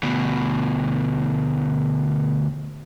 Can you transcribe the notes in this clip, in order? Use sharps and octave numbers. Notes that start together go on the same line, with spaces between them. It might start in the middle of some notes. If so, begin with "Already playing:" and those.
D2 B2